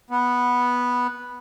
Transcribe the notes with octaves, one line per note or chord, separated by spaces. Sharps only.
B3